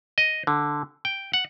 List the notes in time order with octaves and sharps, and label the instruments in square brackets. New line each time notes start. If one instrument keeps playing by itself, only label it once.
[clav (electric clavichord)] D#5
D3
G5
F#5